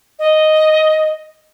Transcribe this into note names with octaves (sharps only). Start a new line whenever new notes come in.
D#5